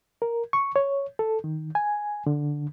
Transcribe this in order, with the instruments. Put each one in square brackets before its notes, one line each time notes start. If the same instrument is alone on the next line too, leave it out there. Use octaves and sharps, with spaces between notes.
[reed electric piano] A#4
C#6
C#5
A4
D#3
G#5
D3